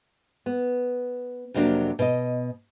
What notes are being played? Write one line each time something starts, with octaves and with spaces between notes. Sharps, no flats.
B3
F2 C3 F#3 A#3 D4
B2 D#5